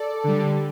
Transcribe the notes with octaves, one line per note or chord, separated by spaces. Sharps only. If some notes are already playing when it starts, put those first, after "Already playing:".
Already playing: A4 D5
D3 G3